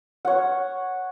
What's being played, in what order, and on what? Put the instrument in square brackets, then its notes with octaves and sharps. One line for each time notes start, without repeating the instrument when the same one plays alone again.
[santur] C#5 F#5